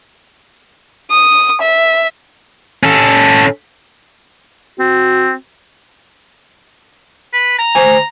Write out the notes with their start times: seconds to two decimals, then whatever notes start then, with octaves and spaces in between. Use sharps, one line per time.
1.11 D#6
1.62 E5
2.83 C#4 A4
4.79 C4 F#4
7.33 B4
7.59 A#5
7.75 D2 C5 G#5